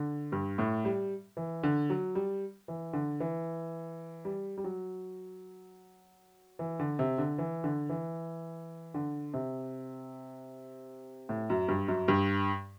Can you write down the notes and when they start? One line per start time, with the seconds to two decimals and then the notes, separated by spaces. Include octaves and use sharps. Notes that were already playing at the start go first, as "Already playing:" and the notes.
Already playing: D3
0.32 G2
0.58 A2
0.85 G3
1.37 E3
1.63 D3
1.90 F#3
2.15 G3
2.68 E3
2.93 D3
3.20 E3
4.25 G3
4.58 G3
4.64 F#3
6.59 E3
6.79 D3
6.99 C3
7.18 D3
7.38 E3
7.64 D3
7.89 E3
8.94 D3
9.34 C3
11.29 A2
11.50 F#2
11.68 G2
11.88 F#2
12.08 G2